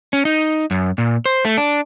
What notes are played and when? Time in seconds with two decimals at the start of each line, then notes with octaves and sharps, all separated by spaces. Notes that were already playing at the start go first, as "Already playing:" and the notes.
0.13 C#4
0.25 D#4
0.71 F#2
0.98 A#2
1.26 C5
1.45 A3
1.57 D4